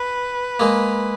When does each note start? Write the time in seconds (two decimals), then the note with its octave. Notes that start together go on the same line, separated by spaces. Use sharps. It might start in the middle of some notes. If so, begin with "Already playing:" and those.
Already playing: B4
0.60 G#3 A#3